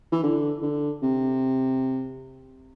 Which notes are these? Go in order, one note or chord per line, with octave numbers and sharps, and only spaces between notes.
E3
D3
D3
C3